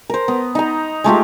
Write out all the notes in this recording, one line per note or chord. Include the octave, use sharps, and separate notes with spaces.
A#4 C5
B3
D#4 A#5
G#3 A3 F4 G4